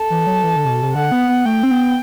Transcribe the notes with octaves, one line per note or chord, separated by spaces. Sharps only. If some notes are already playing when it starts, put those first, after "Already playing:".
Already playing: A4
E3
F#3
E3
D3
C3
B2
C3
D3 F#5
B3
B3
A3 G5
C4
B3